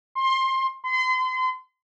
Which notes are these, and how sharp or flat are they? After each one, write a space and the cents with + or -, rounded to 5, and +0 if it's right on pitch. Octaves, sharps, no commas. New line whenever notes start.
C6 +20
C6 -35